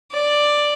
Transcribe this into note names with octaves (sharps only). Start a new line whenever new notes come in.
D5